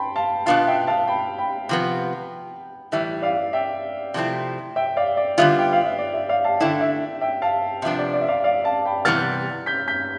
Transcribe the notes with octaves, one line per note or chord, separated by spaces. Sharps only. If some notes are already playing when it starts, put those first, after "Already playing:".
Already playing: G5 A5 B5 C6
F5 A5
B2 B3 D4 F4 F5 A5
E5 G5
F5 A5
G5 B5
G5 B5
C3 F3 B3
A2 E3 G3 E5
D5 F5
E5 G5
C3 F3 A3 C4 E4
E5 G5
D5 F5
D5
D3 G3 B3 F4 E5
G5
F5
E5
D5
E5
D5 F5
F5 A5
D3 A3 E4 E5 G5
E5
E5 G5
F5 A5
C3 F3 B3 D4 E5
D5
D5
E5
D5 F5
D5 F5
F5 A5
G5 B5
C3 E3 G3 B3 F6 A6
G6 B6
G6 B6